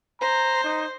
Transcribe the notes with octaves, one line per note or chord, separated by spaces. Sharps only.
C5 A#5
D#4